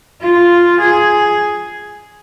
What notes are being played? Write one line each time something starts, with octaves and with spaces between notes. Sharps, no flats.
F4
G#4